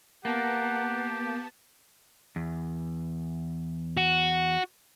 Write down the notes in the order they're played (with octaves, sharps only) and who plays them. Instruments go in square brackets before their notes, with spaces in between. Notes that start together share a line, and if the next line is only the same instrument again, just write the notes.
[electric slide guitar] A#3 [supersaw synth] B3 A5 [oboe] G4 [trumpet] F#5
[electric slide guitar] E2
[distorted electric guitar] F#4